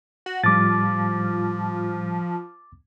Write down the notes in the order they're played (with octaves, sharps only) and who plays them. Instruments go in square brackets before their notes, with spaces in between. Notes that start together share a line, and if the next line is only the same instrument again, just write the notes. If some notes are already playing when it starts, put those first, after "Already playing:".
[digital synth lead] F#4
[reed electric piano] A2 G3 [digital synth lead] F3 [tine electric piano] D6 A6